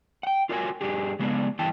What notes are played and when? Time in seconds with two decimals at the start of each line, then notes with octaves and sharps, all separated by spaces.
0.23 F#5 G5
0.49 F4 F#4 A#4 C#5 D5 G#5
0.81 G2 D4 G4 G#4
1.19 C#3 G#3 B3 D4
1.59 G2 E3 E4 G5 A5